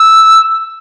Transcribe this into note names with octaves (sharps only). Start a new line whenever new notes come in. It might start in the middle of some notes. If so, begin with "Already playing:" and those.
Already playing: E6